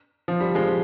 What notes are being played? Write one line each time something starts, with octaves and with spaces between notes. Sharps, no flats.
F3
G3
F3 G#3